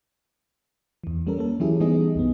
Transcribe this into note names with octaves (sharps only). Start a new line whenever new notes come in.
E2 E3
G3 C#4 A4 A#4
A#3 A4
E3 F#3 C#4 E4 G4 G#4
E3 G3 B3 D#4 G#4 D#5
B1 F2 B3